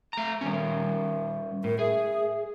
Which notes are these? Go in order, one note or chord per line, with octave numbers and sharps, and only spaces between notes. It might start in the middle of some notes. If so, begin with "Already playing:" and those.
A3 A#5
D#3 G3 C#4
A2 A#4
G#4 E5